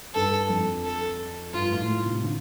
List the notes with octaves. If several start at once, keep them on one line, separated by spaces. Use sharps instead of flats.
G2 A4
F2
A4
G2 F4
A2
A2
C3
D3